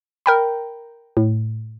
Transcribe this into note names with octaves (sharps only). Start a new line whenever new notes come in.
A#4 G5 B5
A2